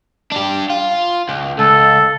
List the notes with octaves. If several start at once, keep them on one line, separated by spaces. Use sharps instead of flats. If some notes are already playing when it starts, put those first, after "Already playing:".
D4 G4
F4
C#2
C#2 A4